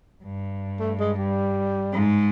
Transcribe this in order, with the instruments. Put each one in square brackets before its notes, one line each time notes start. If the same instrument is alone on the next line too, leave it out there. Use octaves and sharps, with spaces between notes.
[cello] G2
[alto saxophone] A3
G#3
G3
[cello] G#2